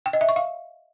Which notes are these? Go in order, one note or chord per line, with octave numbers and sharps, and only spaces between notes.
G5
D#5
E5
C#6
F5